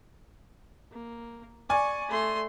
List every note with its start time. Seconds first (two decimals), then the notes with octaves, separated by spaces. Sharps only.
0.92 A#3
1.70 D5 G#5 C#6
2.09 A3 C6